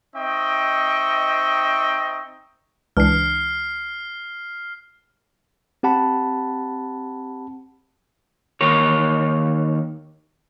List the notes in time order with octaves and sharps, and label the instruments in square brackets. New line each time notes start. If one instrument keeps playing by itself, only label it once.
[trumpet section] C4 D#4 D#5 E5 G5 C#6
[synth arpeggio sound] C#2 E3 D4 [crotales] F6 C7
[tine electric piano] C4 G4 F#5 A5 B5
[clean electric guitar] D#2 A#4 C#5